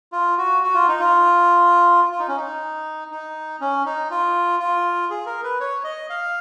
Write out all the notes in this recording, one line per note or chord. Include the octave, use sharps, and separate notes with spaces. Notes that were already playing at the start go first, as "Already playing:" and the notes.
F4
F#4
F#4
F4
D#4
F4
F4
D#4
C#4
D#4
D#4
C#4
D#4
F4
F4
G#4
A#4
B4
C#5
D#5
F5